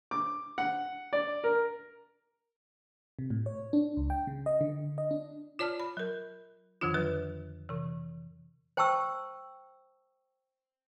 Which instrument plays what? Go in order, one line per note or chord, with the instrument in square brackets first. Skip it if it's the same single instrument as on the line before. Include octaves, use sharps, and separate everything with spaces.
[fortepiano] D6
F#5
D5
A#4
[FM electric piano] C3
A2
C#5
D4
C#2
G5
C#3
D#5
D3
D#5
D4
[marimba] F4 C#5 D5 A5 F6
B5
F#3 A#4
F2 D3 D#3 F3 D4 F4
F3 F#3 B4
C3 E3
[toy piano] C5 G5 A5 C#6 E6